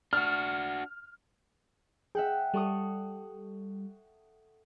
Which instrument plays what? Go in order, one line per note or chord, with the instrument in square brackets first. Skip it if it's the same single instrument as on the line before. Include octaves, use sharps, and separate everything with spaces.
[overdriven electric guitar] D4 F#4 [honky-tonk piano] F6
[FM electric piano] G#4 [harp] E5 F#5 G5
[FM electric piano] G3 [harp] A4 C#6 D#6